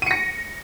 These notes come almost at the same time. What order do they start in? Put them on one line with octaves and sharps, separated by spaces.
D#7 C#7 A#6